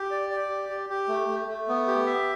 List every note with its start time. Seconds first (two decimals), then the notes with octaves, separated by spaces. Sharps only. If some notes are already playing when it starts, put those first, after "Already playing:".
Already playing: G4
0.11 D5
0.30 D5
0.49 G4
0.69 G4
0.90 G4
1.08 A3
1.28 A3
1.48 A3
1.68 B3
1.87 G4
2.06 E5